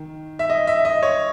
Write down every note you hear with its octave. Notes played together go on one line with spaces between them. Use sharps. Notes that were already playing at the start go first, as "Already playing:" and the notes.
Already playing: D#3
E5
D#5
E5
D#5
C#5